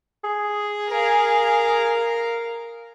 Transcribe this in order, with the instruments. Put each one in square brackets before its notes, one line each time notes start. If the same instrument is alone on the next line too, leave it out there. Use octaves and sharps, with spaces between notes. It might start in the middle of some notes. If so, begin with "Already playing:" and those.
[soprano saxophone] G#4
[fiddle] A#4 F5